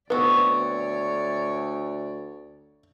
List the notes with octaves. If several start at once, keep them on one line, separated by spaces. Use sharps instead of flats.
D2 B3 C4 F#4 C#5 D5